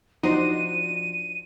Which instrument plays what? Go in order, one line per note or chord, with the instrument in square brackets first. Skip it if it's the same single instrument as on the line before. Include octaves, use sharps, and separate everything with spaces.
[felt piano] F3 [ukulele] D4 F#4 C5 [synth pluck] D#4 [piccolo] D#7